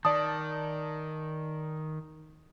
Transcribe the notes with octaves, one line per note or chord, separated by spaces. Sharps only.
D#3 D5 A5 D#6